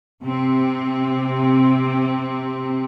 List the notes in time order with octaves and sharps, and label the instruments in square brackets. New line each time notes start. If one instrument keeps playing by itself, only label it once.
[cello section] C3 C4